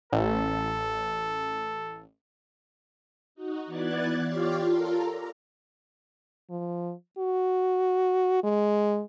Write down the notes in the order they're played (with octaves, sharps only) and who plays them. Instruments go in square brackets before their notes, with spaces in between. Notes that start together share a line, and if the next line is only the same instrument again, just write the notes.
[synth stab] A1 [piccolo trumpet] A4
[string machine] D#4 F#4
E3 B3 D5 F#6 G#6 A6
F4 G4 C#5 D5 F5
F4 A4 A#4
A#5
[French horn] F3
F#4
G#3